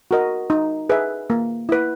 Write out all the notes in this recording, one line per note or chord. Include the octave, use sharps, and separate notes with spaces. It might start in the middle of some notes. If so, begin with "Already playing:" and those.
F#4 A#4 D#5
D#4
G#4 B4 E5
A#3
E4 B4